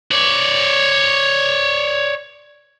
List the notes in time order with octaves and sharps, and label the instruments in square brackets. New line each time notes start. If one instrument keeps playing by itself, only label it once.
[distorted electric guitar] C#5 D5